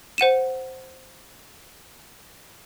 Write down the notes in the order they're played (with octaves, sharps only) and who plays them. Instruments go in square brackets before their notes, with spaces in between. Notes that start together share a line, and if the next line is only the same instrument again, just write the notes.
[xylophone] C5 F#5 D#7 E7